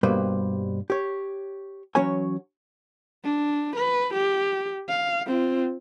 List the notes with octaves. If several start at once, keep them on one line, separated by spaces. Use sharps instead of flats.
G2 B2 G3 A#3 B4 C5
G4 C#5
E3 F#3 C#4 F#4 C#5 G#5
D4
B4
G4
F5
C4 F4